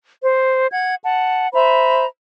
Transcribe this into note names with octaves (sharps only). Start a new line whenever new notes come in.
C5
F#5 G#6
F#5 A5
C5 E5 A#5 B5